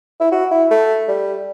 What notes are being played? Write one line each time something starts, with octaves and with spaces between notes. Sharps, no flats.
E4
F#4
E4
A3
G3